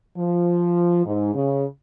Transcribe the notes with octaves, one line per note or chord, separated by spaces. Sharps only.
F3
G#2
C#3